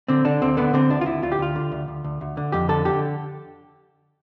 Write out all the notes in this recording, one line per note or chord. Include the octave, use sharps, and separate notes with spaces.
D3 C4
D3 D4
D2 C4
D3 B3
D3 C4
D2 D4
F4
D2 E4
D2 F4
G4
D2 F4
D3
D2
D2
D2
D2
D3
F2 G4
D3 A4
D3 G4